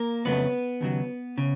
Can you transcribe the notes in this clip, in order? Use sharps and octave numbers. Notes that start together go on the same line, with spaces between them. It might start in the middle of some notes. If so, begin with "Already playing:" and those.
Already playing: A#3 A#4
F2 C#3 F#3 A3 B3 B4
D#2 C#3 F#3
C#3